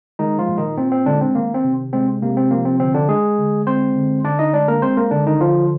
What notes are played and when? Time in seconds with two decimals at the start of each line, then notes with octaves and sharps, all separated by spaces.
0.19 D#3 G#3 D#4
0.38 F3 F4
0.48 A#2
0.58 D#3 D#4
0.78 A#2 C4
0.92 C4
1.06 D3 G#3 D4
1.21 C4
1.35 D#3 A#3
1.54 C4
1.64 C3
1.93 G#3 C4
2.22 C3 A#3
2.37 C4
2.51 F3 A#3
2.65 C4
2.79 D3 C4
2.94 D3 D4
3.08 G#3 G#4
3.38 D3
3.67 G#3 C4 C5
3.95 D3
4.24 D3 D4 D5
4.39 D#4 D#5
4.53 G#3 D4 D5
4.68 A#3 A#4
4.82 G#3 C4 C5
4.97 A#3 A#4
5.11 D3 D4
5.26 D#3 D#4
5.40 D3 F3 F4